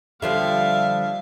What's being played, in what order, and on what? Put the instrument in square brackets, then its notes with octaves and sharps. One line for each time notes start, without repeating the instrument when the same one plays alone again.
[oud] D3 F3 G3 [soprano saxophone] E5 [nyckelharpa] F5